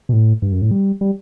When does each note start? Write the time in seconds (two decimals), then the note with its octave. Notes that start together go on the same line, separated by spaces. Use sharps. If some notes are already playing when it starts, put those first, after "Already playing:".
0.09 B2
0.13 A2
0.42 G2
0.52 F#2
0.62 A2
0.71 G3
1.01 G3